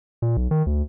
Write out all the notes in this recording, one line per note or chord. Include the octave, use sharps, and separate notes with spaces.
A#2
B1
D#3
D2